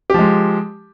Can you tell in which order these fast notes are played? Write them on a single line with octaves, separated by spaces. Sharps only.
G4 F3 G#3